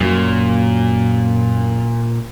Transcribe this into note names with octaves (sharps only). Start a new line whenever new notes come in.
F#2 A#2 F#3